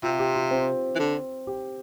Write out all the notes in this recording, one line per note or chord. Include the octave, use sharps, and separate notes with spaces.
C3 F4
G4
F4
C4
E3
D3
G4